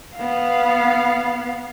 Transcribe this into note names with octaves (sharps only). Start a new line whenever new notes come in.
B3 F5